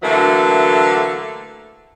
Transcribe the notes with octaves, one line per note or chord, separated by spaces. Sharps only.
D3 E3 F#3 A3 A#3